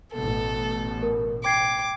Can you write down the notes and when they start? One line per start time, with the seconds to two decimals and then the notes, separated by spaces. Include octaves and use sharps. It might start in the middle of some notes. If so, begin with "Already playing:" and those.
0.13 A1 B2 A4
1.03 A#4
1.45 G5 D6 G#6 C7